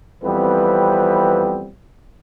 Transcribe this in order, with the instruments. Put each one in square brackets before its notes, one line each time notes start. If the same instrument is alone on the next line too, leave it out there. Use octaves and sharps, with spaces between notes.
[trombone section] F2 E3 G3 B3 C4 B4